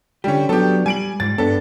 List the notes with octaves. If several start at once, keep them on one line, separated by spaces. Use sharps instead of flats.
D3 G3 C#4 G4
F#3 B3 D4 G4 A4
G3 G#5 D7 F#7
G#2 G3 A6
G2 B3 D4 A4